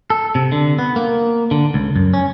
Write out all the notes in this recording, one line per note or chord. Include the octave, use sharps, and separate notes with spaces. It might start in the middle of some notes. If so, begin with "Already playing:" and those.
A4
C3
D3
B3
A#3
D3
C#2
F#2
C#4